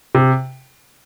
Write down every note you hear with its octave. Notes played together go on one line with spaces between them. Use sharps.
C3